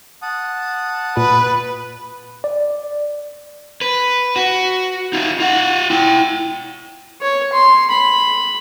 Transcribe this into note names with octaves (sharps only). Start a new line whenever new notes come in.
F#5 A5 D#6
A#2 B4
D5
B4
F#4
D#4 F4
F4 F#5
E4 G5
C#5
C6
B5